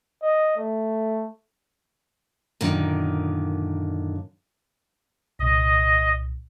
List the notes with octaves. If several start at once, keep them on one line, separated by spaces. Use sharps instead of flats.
D#5
A3
F#2 A#2 D3 D#3
C2 A#2 D#5